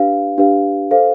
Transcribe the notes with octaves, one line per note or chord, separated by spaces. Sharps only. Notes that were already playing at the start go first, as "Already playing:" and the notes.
Already playing: D4 G4 B4 F5
D4 G4 B4 F5
A4 C5 F5